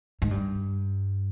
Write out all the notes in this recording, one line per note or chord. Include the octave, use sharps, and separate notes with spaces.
G#2
G2